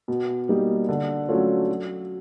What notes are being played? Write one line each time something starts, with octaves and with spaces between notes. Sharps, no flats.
B2
G3 A#3 D#4 G4
D3
F#3 A3 C#4 F4
F#3